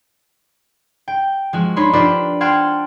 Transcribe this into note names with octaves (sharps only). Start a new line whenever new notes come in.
G5
F3 G#3 F#4
D4 D#4 C#5 B5 C6
D4 F4 G4 B4 C5 D5
F#5 G5 A5 C6 F6 G#6